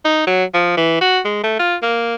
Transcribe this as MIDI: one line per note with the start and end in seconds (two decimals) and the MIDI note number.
0.05 0.25 63
0.27 0.44 54
0.54 0.72 53
0.77 1.00 52
1.01 1.20 66
1.25 1.40 56
1.44 1.56 57
1.59 1.76 65
1.82 2.15 58